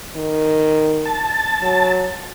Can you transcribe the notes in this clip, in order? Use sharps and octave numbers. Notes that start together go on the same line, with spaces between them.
D#3
A5
F#3